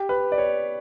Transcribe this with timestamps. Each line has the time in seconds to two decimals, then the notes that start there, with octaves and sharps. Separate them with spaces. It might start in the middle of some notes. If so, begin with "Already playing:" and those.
Already playing: G4
0.09 B4
0.32 D5
0.38 C#5